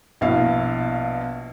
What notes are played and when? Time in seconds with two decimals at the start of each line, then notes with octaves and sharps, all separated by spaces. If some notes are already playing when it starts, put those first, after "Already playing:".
0.21 A#1 B2 E4 F5